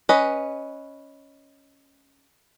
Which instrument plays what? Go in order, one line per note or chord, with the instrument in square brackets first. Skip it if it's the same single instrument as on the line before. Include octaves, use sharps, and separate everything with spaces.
[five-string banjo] C#4 B4 D#5